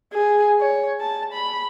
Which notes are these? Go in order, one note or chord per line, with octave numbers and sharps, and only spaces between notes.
G#4
C#5
A5
B5